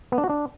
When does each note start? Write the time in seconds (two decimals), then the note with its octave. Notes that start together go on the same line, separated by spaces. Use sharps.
0.12 B3
0.18 D4
0.24 F#4
0.29 D4